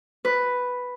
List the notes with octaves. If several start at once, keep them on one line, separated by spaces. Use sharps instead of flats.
B4